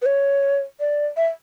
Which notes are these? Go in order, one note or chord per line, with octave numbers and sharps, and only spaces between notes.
B4
C#5
D5
E5